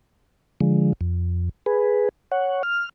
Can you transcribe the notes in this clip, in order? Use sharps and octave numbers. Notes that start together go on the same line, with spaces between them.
D3 F3 G#3
F2
G#4 B4
C#5 F#5
F6